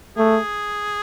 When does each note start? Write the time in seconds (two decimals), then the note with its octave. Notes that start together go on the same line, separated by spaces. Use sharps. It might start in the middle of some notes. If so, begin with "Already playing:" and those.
0.17 A3 G#4